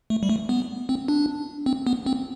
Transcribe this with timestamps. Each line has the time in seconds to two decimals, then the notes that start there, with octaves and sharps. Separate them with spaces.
0.10 A3
0.23 G3
0.29 A3
0.49 B3
0.89 C4
1.08 D4
1.66 C4
1.87 B3
2.06 C4